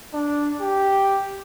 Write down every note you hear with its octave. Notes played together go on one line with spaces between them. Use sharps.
D4
G4